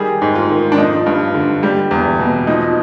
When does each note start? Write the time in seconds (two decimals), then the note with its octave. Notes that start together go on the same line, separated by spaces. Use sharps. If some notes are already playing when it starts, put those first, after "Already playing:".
Already playing: D#3 G3 G#4
0.22 G#2
0.35 F4
0.50 D#3
0.72 D4
0.78 F3 D#4
1.06 G2
1.34 D3
1.63 G3
1.91 E2
2.20 B2
2.47 F3 D#4